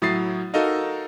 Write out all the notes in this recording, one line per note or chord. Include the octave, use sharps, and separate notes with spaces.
A2 F#3 E4 D#6 A6 C7
D#4 F#4 A4 A#4 D#5 F5